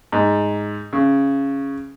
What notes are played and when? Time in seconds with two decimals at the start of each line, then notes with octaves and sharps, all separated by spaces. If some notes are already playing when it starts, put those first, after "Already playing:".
0.12 G#2
0.93 C#3